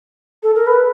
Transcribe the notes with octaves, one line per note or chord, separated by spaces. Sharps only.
A4
A#4
B4